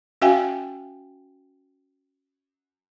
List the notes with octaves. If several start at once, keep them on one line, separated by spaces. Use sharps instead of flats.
C#4 F#4 E5 F5 G5 G#5